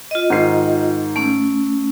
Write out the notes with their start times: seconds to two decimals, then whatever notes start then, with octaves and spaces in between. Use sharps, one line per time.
0.11 F4 D#5
0.30 G#2 D#3 C7
1.16 A3 C#4